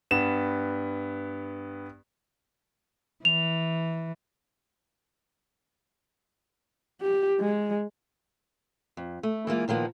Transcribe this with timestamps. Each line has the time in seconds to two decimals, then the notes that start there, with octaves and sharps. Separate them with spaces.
0.11 G2 B3 E7
3.25 E3 F7
7.01 G4
7.40 G#3
8.97 F2
9.23 A3
9.47 E3 G#3 A#3 F4
9.68 A#2 D#3 F3 A#3 B3